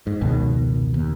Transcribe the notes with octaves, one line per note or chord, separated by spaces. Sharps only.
G#2
F1 C#2 B2 D#3
D#2